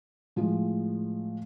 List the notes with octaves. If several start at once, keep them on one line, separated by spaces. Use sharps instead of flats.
A2 F3 G#3